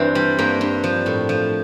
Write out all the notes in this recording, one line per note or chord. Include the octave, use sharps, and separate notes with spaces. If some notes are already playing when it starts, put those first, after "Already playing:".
Already playing: G2 E3 C4 D4
G3
G2 A#3
G2
F3
A2
F3